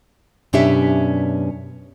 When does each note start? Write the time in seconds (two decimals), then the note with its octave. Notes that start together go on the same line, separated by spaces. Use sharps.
0.53 F#2 B2 C#4 D4 G4 E5